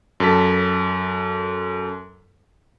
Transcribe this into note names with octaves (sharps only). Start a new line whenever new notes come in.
F#2 A4 A5 B6